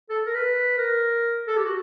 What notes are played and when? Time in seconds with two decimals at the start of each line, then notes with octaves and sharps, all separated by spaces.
0.10 A4
0.26 A#4
0.35 B4
0.78 A#4
1.47 A4
1.57 G4
1.65 F#4